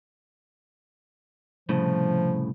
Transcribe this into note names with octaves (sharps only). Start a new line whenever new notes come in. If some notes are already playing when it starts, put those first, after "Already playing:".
C2 A2 C#3 F3